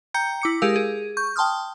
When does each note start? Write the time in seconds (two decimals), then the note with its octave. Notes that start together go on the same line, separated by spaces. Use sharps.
0.14 G5 A#5 G6 C#7
0.41 E4 D6 C#7
0.62 G#3 G4 G#4 A#4 F5 E6
0.76 G#4
1.17 C#6 G6
1.36 G5 A5 C6 D#6 F6